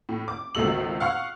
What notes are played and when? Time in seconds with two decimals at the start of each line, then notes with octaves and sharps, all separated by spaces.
0.09 A2
0.28 D6
0.55 G#1 C#2 B2 A3 E6 F#7
1.00 F5 F#5 C#6 F6